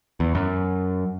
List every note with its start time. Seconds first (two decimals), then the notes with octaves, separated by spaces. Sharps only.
0.20 E2
0.35 F#2